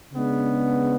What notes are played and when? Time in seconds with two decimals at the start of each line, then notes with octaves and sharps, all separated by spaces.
0.13 C#3 G#3 B3 D4